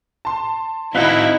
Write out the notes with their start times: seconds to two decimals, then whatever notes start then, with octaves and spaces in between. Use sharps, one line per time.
0.25 A5 C6
0.95 C4 D#4 E4 F#4 F5 F#6 B6